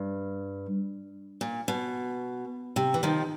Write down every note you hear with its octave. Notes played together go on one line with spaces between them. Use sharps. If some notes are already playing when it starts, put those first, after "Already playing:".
Already playing: G2
A#2
B2
C3
E3
D#3 F3